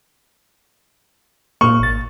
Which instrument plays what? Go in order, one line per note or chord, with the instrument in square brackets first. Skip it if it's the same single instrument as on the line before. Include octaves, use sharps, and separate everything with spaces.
[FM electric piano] A#2 A#3 [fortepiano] C#6
[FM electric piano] G#1 A6